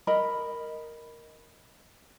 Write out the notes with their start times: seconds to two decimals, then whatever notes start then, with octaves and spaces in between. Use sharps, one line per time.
0.07 A#4 D#5 B5